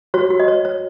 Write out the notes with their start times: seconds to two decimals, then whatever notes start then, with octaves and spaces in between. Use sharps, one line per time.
0.14 F#4 C#5
0.30 F#4
0.40 D#5
0.48 C#5
0.65 C#5